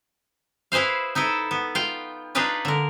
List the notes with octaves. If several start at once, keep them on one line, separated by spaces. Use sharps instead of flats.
E4 G#4 B4 C5 F5
D#4 E4 A4 D#5
B3
F4 F5 G5
D4 D#4 F4 G#4 B4 D5
D3 A#4